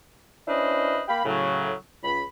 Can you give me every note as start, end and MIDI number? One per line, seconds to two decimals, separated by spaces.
0.47 1.02 61
0.47 1.02 62
0.47 1.02 64
0.47 1.02 71
0.47 1.02 72
0.47 1.02 75
1.08 1.21 58
1.08 1.21 77
1.08 1.21 79
1.08 1.21 83
1.25 1.72 45
1.25 1.72 49
1.25 1.72 54
2.04 2.21 37
2.04 2.21 83